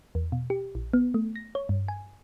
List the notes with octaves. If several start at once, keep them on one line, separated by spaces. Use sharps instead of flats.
E2
B2
G4
A#1
B3
A3
A#6
C#5
G2
G#5